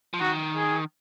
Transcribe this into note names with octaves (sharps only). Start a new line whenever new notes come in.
F3
D#3 F#4
G#4